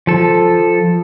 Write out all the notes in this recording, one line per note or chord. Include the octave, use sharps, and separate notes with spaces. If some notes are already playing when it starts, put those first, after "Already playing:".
F3 A4